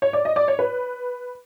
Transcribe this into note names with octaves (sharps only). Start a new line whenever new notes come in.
C#5
D5
D#5
D5
C#5
B4